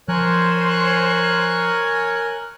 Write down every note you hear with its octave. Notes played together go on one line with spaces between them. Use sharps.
F3 A#4 C5 C#5 G#5 F#6